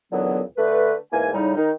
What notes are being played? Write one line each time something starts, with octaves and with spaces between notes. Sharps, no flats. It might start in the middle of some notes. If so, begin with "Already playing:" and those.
C#2 A#2 D3 E3 F#3 B3
D3 A3 B4
E2 G#2 E3 A#3 G#5
A2 C#3 G3 D#4
D#3 D#4